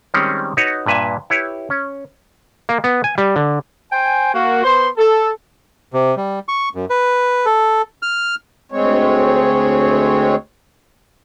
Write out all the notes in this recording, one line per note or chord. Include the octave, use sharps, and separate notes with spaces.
D#3 G3 G#3 C4 C#4
D#4 F#4 B4 C#5
G2 A#2 B4 E5 G#5
E4 G4 B4 C#5
C#4
A#3
B3
G#5
G3
D3
C5 G5 G#5
A#3 F#4
B3 C5 C6
A4
C3
G3
C#6
F#2
B4
A4
F6
D2 G#3 C4 C#5